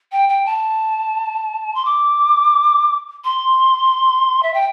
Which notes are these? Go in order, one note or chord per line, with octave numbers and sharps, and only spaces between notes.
G5
G5
A5
C6
D6
C6
E5
G5